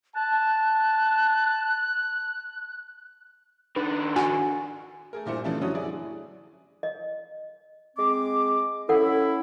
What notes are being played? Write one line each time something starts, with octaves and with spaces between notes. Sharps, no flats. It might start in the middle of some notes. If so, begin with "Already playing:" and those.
A5 F#6
D#3 D4 B4
F#4 G#5
A3 G#4 A#4
G2 A#2 E4 C5 C#7
C#3 E3 F3 A3 D4 E4
F#2 D3 F#3 G3 C#5 D#6
D4 E4 G#4 D5
D#5
G#3 C4 D6
C#4 E4 A4 F#5